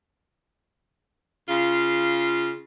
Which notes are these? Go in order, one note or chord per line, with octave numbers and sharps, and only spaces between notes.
C#3 F4